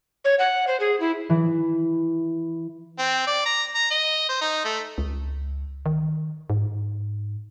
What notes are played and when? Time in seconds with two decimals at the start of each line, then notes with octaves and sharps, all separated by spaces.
0.25 C#5
0.39 F#5
0.67 C5
0.80 G#4
1.00 E4
1.30 E3
2.99 C4
3.27 D5
3.46 A#5
3.75 A#5
3.91 D#5
4.29 C5
4.41 D#4
4.65 A3
4.98 C#2
5.86 D#3
6.50 G#2